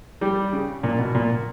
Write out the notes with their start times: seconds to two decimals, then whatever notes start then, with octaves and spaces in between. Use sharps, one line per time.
0.21 G3
0.53 C#3
0.83 A#2
0.99 B2
1.15 A#2